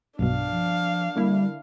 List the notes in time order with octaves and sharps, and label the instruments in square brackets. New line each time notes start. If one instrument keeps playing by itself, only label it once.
[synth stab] B1 G2 B2 [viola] D4 F5
[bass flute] F3
[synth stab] D3 A#3 E4 [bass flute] G3